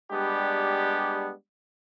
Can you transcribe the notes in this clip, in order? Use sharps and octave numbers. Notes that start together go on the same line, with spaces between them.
G3 G#3 B3 D4 G4